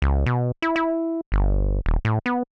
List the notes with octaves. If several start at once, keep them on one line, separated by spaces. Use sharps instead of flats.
C#2
B2
E4
E4
G1
D#1
A2
B3